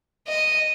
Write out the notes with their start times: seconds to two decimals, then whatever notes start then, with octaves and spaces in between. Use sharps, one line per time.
0.28 D#5